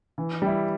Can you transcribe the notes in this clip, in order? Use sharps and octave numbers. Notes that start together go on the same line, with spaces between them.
E3
G3 E4